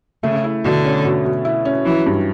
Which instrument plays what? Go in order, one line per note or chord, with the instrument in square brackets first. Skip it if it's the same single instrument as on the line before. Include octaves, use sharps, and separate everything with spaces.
[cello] C#3 [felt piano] A3
[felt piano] E4
[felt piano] B2 [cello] D3
[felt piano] C#4
B2
B2
E4
C#4
[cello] E3 [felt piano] F#3
[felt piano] G2